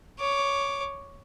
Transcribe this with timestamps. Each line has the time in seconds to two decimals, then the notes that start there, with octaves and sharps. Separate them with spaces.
0.19 C#5 D6